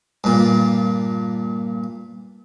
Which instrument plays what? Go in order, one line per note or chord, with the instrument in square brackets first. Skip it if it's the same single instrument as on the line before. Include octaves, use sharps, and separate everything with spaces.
[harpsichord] G2 A#2